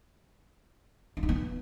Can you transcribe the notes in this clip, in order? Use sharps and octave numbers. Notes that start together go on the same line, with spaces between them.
D4
D#4
B3